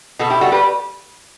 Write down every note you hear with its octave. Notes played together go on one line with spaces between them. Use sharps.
B2 F#4 A4
E4 G4
G3 F#4 A4
G4 B4